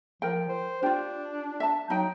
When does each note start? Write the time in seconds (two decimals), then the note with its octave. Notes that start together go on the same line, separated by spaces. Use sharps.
0.22 F3 A#4 G5
0.49 C5
0.83 D4 F4 G4
1.60 E5 A5
1.90 F#3 D#4 G5